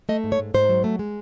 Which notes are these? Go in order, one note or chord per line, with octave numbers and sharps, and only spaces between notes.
A3 D#5
G#2
C#5
G#2
G#2 C5
F#3
A3
G#3